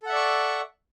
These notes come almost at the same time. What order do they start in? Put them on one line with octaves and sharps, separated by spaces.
A4 F#5 E5 D5 C#6